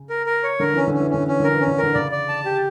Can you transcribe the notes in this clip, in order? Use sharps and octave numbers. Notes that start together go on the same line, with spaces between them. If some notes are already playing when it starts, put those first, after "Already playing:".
Already playing: C#3
A#4
A#4
C#5
D3 A#4
E3 C#4
D3
C#4
E3
D3 C#4
E3 C#4
D3 A#4
E3
C#4
D3
A#4
D3
C#3 D5
D5
A5
G4